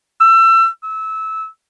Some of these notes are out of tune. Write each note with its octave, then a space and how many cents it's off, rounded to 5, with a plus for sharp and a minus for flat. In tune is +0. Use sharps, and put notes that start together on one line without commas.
E6 +30
E6 -20